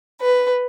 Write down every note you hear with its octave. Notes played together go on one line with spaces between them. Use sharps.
B4